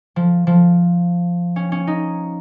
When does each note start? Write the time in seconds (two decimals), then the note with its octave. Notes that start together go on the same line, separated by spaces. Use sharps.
0.16 F3
0.47 F3
1.56 C#4
1.72 C#4
1.87 D#4